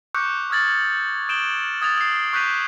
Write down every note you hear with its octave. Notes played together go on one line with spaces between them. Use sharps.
C#6 D6 E6 F#6 G6 C#7
C#6 D#6 F6 G#6 A6 F#7
D#6 G6 D7 E7 F#7 G7
D#6 G#6 A6 F7
E6 C7
C#6 F#6 G6 B6 D#7 F7